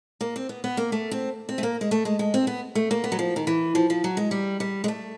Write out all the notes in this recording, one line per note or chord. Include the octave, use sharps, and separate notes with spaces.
A#3
C4
B3
B3
A#3
A3
C4
C4
A3
A#3
G#3
A3
G#3
G#3
C4
B3
A3
A#3
B3
F#3
F3
D#3
E3
F3
F3
F#3
G#3
G3
G3
G#3
A3